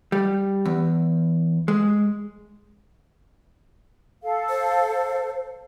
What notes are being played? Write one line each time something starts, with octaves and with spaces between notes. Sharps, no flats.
G3
E2
G#3
A4 F5
C5